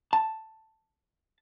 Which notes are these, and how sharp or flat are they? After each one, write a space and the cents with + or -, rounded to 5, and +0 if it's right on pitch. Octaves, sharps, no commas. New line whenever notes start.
A5 +5